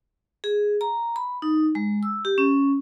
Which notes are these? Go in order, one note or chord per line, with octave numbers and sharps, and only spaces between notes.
G#4
A#5
B5
D#4
G#3
E6
G4
C#4